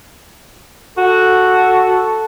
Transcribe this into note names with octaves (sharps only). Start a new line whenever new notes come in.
F#4 A4